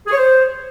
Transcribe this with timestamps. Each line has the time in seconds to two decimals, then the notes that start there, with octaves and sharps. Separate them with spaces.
0.07 G#4
0.12 C#5
0.17 C5